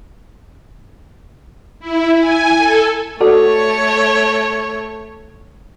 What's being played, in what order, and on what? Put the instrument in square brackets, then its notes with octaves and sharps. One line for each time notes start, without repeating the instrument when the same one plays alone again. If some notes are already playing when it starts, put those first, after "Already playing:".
[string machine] E4
G#5
A4
[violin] A3 C#5 [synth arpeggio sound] F#4 A4 D5